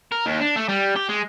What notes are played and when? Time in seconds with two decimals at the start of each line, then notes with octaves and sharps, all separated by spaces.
0.12 A#4
0.26 D#2
0.41 D4
0.56 A3
0.69 G3
0.96 G4
1.09 G#3